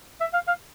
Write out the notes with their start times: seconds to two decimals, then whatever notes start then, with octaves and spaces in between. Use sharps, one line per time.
0.20 E5
0.33 F5
0.47 F5